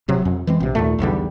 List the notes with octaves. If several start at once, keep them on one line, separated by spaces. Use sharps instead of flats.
D1 C3 F#3
F2
E3 G#3 C4
A#1 C3
D#2 A#2 A3
B1 E2 D3 G3